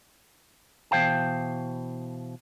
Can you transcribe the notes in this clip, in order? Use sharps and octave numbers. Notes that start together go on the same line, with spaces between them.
B2 E3 C5 F5 G5 A5